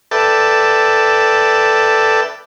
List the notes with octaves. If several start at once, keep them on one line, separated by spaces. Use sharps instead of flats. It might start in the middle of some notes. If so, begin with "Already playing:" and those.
A4 B4 D5 E5 G5 A5